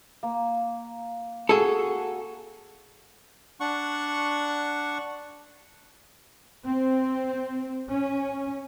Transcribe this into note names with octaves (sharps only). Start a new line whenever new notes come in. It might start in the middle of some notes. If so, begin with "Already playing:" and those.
A#3
F#4 G#4 A4 G#5
D4 F#5 C#6
C4
C#4